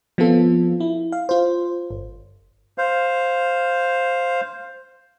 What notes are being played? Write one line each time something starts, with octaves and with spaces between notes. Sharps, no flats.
F3 B3 C4 F4 A4
E4
F5
F4 C5
G1
C5 F5